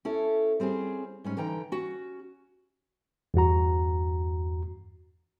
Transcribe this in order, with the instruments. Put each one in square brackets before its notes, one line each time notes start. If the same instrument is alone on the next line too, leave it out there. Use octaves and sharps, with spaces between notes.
[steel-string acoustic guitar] C#4 E4 A4
G3 C4 C#4 G#4
G#2 G3 C#4
D3 E3 D#4 G5 A#5
C#4 F#4
[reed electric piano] E2 G2 F#4 A#5